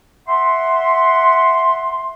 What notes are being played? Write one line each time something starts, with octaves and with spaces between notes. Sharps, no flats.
E5 F#5 C6